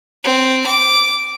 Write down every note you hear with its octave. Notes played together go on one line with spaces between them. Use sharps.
C4
D6